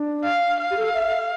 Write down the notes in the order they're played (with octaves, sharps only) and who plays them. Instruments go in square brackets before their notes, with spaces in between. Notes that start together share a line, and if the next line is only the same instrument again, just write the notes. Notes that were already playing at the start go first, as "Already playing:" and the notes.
Already playing: [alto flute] D4
[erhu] F5
F5
[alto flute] G4
A4
E5